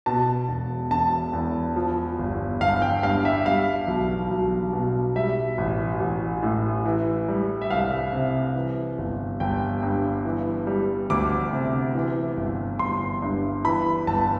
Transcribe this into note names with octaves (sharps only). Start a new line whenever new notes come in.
B2 A5
E1
E1 A5
E2
F3
G1
G1 F5
G5
G2 F5
E5
G3 F5
B1
B1
B2
G3 E5
A1
A1
A2
E3
G3
E5
C2 F5
C3
E3
G1
G1 G5
G2
E3
G3
D2 D6
C3
E3
G1
G1 C6
G2
E3 B5
G1 A5